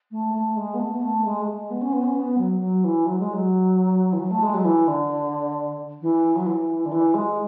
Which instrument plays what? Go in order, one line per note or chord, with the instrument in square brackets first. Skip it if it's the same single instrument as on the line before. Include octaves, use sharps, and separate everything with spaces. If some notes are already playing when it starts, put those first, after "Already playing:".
[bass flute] A3
A3
G#3
B3
A3
B3
A3
G#3
A3
G#3
B3
C#4
B3
C#4
B3
F#3
F#3
E3
F#3
G#3
F#3
E3
F#3
A3
G#3
F#3
E3
D3
E3
F#3
E3
D3
E3
G#3